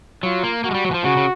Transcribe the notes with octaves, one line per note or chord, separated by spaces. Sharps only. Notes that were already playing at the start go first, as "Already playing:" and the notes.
F#3 F4
A#3
A#3 F#4
G#3
G3
F#3
E3
F3
C#3 F#4
C#3